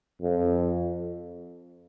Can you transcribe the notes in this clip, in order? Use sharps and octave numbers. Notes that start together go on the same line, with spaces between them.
F2